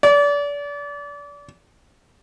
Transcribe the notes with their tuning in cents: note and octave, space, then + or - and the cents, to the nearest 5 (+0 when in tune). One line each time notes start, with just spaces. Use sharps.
D5 -30